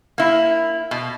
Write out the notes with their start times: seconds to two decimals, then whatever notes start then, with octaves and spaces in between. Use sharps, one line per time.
0.18 A#3 E4
0.91 B2